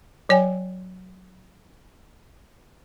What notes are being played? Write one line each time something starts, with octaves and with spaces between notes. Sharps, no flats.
F#3 C#5 G5 G#5